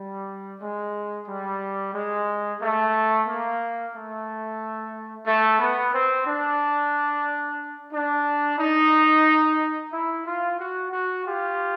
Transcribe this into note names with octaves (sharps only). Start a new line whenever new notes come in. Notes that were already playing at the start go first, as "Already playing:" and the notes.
Already playing: G3
G#3
G3
G#3
A3
A#3
A3
A3
B3
C4
D4
D4
D#4
E4
F4
F#4
F#4
F4 G4